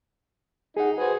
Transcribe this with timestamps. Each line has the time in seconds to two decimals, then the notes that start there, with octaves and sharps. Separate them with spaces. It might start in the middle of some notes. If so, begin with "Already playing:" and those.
0.77 D#4 G#4 F#5
0.98 F#4 G#4 B4 C5